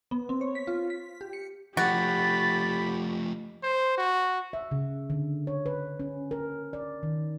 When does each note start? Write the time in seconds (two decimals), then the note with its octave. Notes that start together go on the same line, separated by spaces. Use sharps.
0.11 B3
0.29 C4
0.41 C#5
0.55 B6
0.67 F4
0.90 B6
1.21 G4
1.33 C#7
1.77 F3 A3 F#4 G4 B5 A6
3.63 C5
3.98 F#4
4.53 E5
4.71 C#3
5.10 D3
5.47 C#5
5.66 B4
6.00 C#4
6.31 A#4
6.73 D5
7.03 D#3